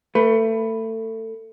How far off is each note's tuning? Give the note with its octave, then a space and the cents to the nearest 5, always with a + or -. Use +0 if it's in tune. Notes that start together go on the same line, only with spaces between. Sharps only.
A3 +25 B4 +0